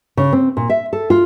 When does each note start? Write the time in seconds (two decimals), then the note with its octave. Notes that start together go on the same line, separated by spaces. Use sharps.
0.17 C#3
0.32 C4
0.57 A#2
0.70 E5
0.93 A4
1.10 F4